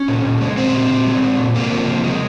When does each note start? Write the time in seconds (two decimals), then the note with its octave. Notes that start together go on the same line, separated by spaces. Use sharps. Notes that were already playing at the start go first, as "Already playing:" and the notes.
Already playing: C#4
0.08 A#2
0.25 A#2
0.41 G#3
0.57 G#3 C4
0.73 A#2
0.90 A#2
1.07 G#3
1.22 G#3
1.38 A#2
1.55 C3 A#3
1.72 F3
1.88 C3
2.04 G#3